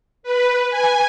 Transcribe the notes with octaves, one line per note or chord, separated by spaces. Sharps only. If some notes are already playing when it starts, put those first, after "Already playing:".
B4
G#5